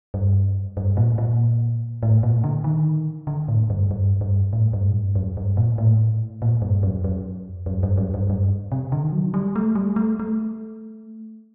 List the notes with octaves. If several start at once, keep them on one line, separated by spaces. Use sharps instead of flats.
G2
G2
A#2
A#2
A2
A#2
D3
D#3
D3
A2
G2
G2
G2
A2
G2
A2
G2
F#2
G2
A#2
A2
A#2
G2
F#2
F#2
F#2
G2
F#2
G2
G2
C3
D3
D#3
F#3
G3
A3
G3
A3
A3